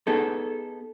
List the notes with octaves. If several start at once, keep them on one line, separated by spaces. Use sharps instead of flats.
B3 D#4 G#4 A4